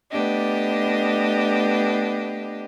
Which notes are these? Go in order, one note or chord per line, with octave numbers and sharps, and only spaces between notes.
A3 B3 D4 G4 D#5